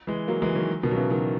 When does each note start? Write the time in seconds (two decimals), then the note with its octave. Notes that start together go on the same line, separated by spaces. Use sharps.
0.07 E3 G#3
0.28 F#3 A#3
0.42 E3 G#3
0.55 D#3 F#3
0.83 B2 D#3
0.91 F#3
0.96 C#3 E3
1.10 D#3 F#3